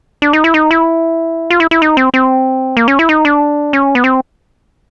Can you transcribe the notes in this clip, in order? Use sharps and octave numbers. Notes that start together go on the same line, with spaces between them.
D4
D#4
E4
D#4
E4
F4
E4
E4
D#4
C4
C4
A#3
C#4
E4
D#4
D4
C#4
B3
C4